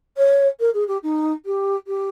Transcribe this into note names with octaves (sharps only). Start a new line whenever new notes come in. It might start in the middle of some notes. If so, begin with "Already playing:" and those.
C#5
A#4
G#4
G4
D#4
G4
G4